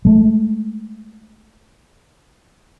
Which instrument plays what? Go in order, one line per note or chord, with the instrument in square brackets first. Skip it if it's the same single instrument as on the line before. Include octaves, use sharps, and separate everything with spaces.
[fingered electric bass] G#3 A3